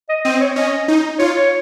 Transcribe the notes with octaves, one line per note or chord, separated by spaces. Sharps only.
D#5
C4 D#5
C#5
C#4 D#5
D#4
F4 C#5
C#5